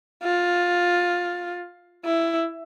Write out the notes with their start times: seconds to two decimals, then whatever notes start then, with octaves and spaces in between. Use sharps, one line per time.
0.24 F4
2.05 E4